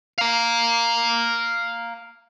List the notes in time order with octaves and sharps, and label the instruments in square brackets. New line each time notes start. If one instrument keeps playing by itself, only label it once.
[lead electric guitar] F5 A#5